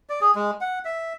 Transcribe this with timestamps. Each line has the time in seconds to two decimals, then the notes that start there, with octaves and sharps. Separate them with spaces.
0.10 D5
0.21 G#4
0.35 G#3
0.61 F#5
0.85 E5